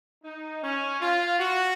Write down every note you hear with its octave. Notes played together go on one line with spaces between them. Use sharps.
D#4
C#4
F4
F#4